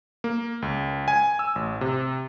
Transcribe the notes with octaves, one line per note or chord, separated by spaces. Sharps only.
A#3
C#2
G#5
E6
A1
C3